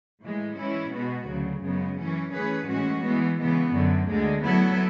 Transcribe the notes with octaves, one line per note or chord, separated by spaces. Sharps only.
A2 E3 G#3
E3 G#3 C#4 E4
B2 G#3 B3 F#4
D2 C#3 F#3
F#2 C#3 G#3 B3
E3 A3 C#4
E3 A3 C#4 G#4 B4
A2 E3 G#3 C#4 F#4
E3 G#3 B3
C#3 E3 B3
F#2 D3 F#3
D2 D3 G#3
F#3 B3 E4 A4